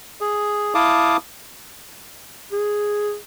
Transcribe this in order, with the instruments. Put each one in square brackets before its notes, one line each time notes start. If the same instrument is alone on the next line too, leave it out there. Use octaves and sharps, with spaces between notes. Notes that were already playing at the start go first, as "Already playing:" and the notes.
[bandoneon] G#4
E4 F5 A5 D6 D#6
[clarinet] G#4